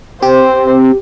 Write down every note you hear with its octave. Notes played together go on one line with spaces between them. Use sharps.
C4 G4 C5